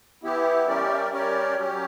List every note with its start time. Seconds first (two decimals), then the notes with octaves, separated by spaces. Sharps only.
0.23 E3 B3 E4 G4 E5
0.67 G3 C#4 G4 A#4 D5
1.12 G3 C#4 G4 A#4 C#5 D5
1.55 F#3 C#4 G4